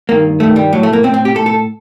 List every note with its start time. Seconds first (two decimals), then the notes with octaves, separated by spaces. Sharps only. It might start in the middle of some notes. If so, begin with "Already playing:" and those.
0.09 G2 D#3 A#3
0.40 G2 D#3 A3
0.56 G3
0.73 A2 F#3
0.83 A3
0.93 A#3
1.03 A2 C4
1.14 C4
1.25 G4
1.35 A2 A4
1.46 A4